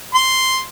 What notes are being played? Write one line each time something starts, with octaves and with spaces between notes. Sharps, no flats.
C6